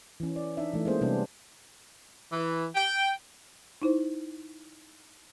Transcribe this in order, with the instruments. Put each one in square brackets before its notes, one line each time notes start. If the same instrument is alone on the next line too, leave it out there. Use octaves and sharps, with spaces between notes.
[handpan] E3 C#4
D5
D4 D#4 E5
E3 A3
G#3 A#3 C#4 G#4 C5
C3 G3 B3 D4
[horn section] E3
G5
[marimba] D#4 E4 C5